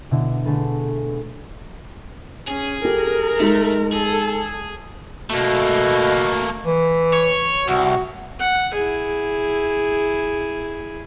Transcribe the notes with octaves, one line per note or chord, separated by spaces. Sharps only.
B2 D3 E4
D3 A3 G#4 A4 B4
C#4 G#4
G4 A4 A#4 A#5
G#3 A3 D#4
G#4 A4
B2 A3 A#3
E3
C#5
C2 F#4
F#5
E4 G#4